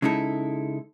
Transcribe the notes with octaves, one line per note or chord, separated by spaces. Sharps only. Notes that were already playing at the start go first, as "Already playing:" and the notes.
C#3 G#3 D#4 E4 A4